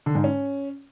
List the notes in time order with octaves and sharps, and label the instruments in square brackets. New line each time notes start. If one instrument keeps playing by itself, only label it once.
[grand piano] D3
G#2
C#4